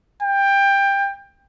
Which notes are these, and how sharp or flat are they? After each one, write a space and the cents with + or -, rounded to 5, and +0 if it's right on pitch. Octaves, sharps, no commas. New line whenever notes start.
G5 +20